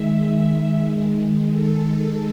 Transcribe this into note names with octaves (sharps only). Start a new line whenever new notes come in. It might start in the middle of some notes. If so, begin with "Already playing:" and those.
Already playing: D#3 G#3 E5
D#3 G#3
A4